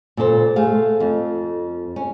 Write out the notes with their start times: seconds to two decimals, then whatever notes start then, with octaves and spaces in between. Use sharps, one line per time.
0.17 A#2 C#3 A4 C5
0.56 A3 G#4 F5
1.00 F2
1.96 C#4